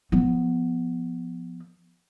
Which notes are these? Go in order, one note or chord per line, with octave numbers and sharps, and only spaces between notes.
F3 B3